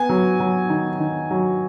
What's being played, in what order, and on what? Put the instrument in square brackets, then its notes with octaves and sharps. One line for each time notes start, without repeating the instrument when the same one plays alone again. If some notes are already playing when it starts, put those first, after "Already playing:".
Already playing: [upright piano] B3 [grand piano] G#5
[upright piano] F#3
F#3
D#3
D#3
F#3